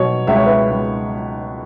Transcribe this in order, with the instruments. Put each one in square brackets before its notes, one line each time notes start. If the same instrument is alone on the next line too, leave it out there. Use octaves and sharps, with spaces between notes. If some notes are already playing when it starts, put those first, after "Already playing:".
Already playing: [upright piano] B2 F#3 C#5
C#2 E5
C#5
B4 E5
C#2